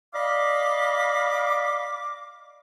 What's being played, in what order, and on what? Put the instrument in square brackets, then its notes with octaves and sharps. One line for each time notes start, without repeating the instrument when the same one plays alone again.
[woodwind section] D5 D#5 F5 B5 D6